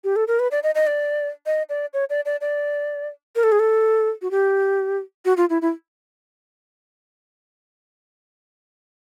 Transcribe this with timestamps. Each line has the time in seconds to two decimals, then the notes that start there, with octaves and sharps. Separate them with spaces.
0.04 G4
0.16 A4
0.28 A#4
0.39 B4
0.51 D5
0.63 D#5
0.75 D#5
0.87 D5
1.46 D#5
1.69 D5
1.94 C#5
2.10 D5
2.25 D5
2.41 D5
3.36 A#4
3.43 A4
3.52 G#4
3.60 A4
4.22 F#4
4.31 G4
5.25 F#4
5.37 F4
5.50 E4
5.62 E4